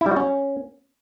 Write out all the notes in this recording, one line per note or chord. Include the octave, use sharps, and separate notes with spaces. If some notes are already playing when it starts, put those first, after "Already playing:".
E4
G3
F#4
C#4